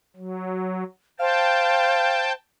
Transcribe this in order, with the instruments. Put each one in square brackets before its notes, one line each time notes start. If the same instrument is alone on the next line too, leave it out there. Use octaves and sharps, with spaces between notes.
[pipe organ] F#3
[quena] C5 [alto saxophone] F5 [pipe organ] G5 A5